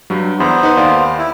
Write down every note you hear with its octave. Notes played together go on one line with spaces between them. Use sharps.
G2 F#3
E2 B3 E4 C5
D#4 B4
D#2 D5 F5
E4